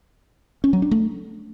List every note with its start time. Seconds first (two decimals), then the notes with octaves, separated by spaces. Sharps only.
0.64 C#4
0.73 F#3
0.82 D4
0.91 A3